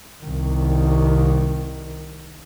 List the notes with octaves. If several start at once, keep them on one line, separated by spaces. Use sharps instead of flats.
C2 D#3